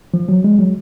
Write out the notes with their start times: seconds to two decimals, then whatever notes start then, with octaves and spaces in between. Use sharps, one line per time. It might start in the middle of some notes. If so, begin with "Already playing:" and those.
0.14 F3
0.29 F#3
0.44 G#3
0.59 F#3